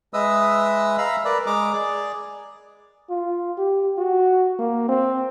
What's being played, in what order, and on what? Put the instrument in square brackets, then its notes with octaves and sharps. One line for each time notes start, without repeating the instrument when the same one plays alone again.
[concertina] G#3 B4 D#5 E5 D#6 E6
E5 F5 A#5 B5 E6
A#4 B4 D5
G#3 D#5 A#5 D6
G#4 D5
[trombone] F4
G4
F#4
A#3
C4